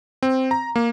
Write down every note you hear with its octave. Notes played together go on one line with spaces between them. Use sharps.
C4
A#5
A#3